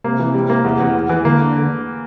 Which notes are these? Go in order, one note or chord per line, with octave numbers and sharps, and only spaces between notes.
C3 A#3
E3
G3
A#3
E2
E2
E2
E3
D3 A#3